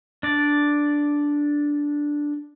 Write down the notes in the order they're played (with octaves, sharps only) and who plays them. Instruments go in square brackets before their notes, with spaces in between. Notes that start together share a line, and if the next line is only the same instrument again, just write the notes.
[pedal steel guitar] D4 D5